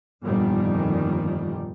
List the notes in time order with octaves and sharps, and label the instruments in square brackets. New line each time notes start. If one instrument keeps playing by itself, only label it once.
[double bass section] G1 F2 A#2 D#3 G3